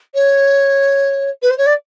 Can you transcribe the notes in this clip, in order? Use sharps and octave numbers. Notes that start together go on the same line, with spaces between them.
C#5
B4
C5
C#5
D5